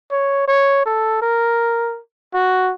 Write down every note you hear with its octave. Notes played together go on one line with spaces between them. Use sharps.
C#5
C#5
A4
A#4
F#4